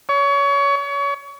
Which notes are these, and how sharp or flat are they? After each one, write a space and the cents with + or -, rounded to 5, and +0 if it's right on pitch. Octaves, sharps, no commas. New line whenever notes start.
C#5 +25
C#5 +30